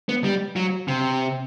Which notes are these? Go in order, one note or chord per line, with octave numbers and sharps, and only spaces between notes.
B3
G3
F#3
C3